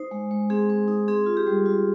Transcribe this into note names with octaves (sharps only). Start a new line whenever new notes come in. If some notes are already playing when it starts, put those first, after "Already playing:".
Already playing: D#4 C5
G#3
G#3
C4 G#4
C4
D#4
C4 G#4
F4
G4
G3
F4